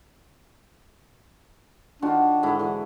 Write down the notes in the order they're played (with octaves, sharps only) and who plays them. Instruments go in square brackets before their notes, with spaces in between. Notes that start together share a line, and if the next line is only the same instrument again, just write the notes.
[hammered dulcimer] D#3 F4 F#4 [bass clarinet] D4
[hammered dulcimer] G#2 D3 E4
D3 E3